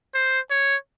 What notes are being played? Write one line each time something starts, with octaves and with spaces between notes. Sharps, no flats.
C5
C#5